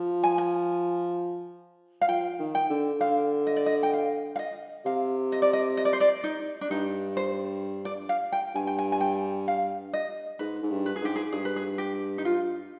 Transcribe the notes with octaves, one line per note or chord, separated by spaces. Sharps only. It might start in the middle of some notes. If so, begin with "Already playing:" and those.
Already playing: F3
G#5
G#5
F5
F3 G5
D#3
G5
D3
D3 F5
D#5
D5
D#5
G5
F5
F5
D#5
C3 F5
D#5
D5
D#5
D#5
D5
C5
D5
D#4
D4
G2 D#4
C5
D5
F5
G5
G2 G#5
G5
G#5
G#5
G5
F5
D#5
G#2 B4
G#2
G2
B4
G#4
G#2 G4
G#4
G2 G#4
B4
G#4
G4
D#4
F4